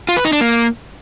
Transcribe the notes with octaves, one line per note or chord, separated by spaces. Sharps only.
F4
B4
D#4
D4
A#3